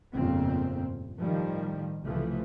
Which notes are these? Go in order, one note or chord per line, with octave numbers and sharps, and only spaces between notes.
G1 F2 A#2 C#3 C4
A2 D#3 F3 G3
C2 C#3 E3 F3 A3